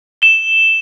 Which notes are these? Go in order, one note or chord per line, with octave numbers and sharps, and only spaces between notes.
E7 G7